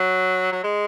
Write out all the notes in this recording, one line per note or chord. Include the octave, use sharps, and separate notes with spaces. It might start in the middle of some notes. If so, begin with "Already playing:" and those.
Already playing: F#3
F#3
G#3